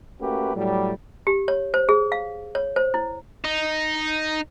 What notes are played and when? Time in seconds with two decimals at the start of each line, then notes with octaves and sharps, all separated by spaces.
0.21 A3 A#3 C#4 F#4 G4 B4
0.56 A2 F#3 G3
1.27 G4
1.48 C#5
1.74 C5
1.89 G#4
2.12 F5
2.55 C#5
2.76 C5
2.94 E4
3.44 D#4